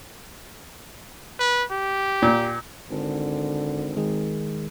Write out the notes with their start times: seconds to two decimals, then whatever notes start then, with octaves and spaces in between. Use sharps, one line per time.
1.39 B4
1.71 G4
2.22 A#2
2.90 G#1 D3
3.97 D#3 G#3 G#4